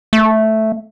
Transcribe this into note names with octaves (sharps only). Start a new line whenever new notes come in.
A3